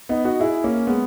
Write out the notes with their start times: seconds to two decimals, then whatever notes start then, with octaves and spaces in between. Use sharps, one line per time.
0.09 B3 D#4
0.24 D#4 F#4
0.40 E4 G#4
0.64 A#3 C#4
0.87 G#3 B3